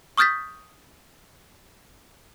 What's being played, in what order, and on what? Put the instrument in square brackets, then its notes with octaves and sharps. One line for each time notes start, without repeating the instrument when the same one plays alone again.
[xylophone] C#6 D#6 F6 G6 A6 B6